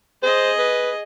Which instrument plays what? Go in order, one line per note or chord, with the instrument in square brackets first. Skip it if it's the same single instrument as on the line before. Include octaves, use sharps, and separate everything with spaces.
[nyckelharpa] G#4 D#5 [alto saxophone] C5
[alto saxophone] B4